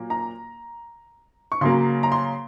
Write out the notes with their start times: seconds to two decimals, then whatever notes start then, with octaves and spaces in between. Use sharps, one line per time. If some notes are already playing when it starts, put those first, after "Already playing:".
Already playing: A#2 F#3 A#3
0.10 A#5
1.52 C#6
1.61 C#3 F#3 A#3 C6
2.03 A#5
2.12 C6